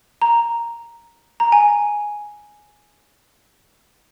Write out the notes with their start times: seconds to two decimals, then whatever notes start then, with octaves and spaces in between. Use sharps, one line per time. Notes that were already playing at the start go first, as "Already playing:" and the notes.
0.22 A#5
1.40 A#5
1.52 G#5